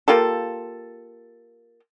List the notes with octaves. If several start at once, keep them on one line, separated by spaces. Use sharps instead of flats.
A#3 F4 G4 A4